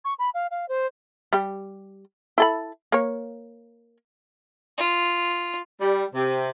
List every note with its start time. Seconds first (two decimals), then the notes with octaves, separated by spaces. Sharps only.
0.05 C#6
0.19 B5
0.34 F5
0.51 F5
0.69 C5
1.33 G3 G4
2.38 E4 A4 B5
2.92 A#3 C#5
4.78 F4
5.80 G3
6.14 C3